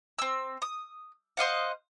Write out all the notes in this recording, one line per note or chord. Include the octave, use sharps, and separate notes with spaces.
C4 E6
D#6
C5 D#5 F5 F#5